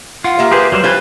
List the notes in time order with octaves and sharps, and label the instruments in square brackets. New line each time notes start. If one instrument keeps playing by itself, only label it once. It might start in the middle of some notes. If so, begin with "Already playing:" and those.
[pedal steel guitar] F4 [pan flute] F#5
[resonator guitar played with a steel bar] A#3 E5 [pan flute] G4
[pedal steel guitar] G4 G#4 C5 [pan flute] B4
[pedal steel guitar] F#3 G3 C5
[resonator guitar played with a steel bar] G3 B4 C5 [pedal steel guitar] F4 G#5 F#6